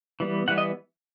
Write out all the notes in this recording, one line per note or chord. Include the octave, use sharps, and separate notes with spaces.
E3 G3 B3
E3 G3 B3 F#5
D#5